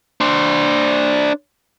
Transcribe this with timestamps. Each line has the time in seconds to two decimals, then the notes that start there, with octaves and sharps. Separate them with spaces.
0.21 D4 C5